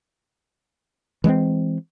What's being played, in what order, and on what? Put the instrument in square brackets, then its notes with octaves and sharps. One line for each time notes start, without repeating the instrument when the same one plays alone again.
[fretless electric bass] E3 G#3 A#3 C4